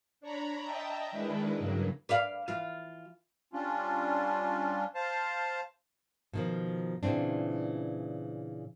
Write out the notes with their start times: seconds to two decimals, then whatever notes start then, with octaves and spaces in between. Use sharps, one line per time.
0.21 D4 C#5 A#5 B5
0.64 D#5 E5 G5 A5 A#5
1.11 D#3 G#3 D4 E4 B4
1.58 G2 C#3 F#3 A#3
2.09 B4 D5 F5
2.48 E3 F4
3.53 G3 C#4 D4 F4
4.95 C5 F5 A5
6.33 B2 D#3 F3
7.03 A#2 C#3 E3 C4 D4